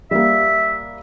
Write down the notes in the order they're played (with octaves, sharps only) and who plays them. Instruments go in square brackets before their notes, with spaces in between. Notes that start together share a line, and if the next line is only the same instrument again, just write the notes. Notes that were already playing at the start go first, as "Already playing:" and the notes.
[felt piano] G3 A#3 [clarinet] E5